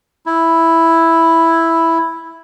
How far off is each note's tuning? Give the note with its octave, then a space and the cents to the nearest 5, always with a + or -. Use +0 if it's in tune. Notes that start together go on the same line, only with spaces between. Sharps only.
E4 +0